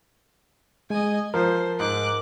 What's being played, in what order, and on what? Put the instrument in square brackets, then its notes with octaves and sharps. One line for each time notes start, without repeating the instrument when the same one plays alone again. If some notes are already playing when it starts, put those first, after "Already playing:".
[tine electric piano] G#3 [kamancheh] D#5 G#5
[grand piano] F3 [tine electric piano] A#4 [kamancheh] C5
[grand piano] G#2 [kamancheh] D6 F#6